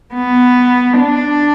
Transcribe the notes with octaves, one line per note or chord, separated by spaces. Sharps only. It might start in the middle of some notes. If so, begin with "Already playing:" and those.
B3
D4